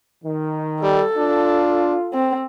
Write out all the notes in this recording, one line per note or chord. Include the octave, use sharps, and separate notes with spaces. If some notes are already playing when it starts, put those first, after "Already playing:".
D#3
G3 A4
D4 F4
C4